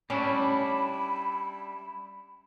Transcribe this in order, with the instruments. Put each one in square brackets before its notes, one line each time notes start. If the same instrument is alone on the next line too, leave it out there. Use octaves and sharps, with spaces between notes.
[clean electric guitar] G3 D4 E4 [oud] C#4 [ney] B5